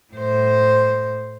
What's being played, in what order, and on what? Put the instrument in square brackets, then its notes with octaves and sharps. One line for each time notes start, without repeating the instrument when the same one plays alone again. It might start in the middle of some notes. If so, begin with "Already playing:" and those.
[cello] A2 C5